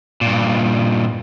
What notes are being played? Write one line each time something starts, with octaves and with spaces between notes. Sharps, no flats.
G2 A#2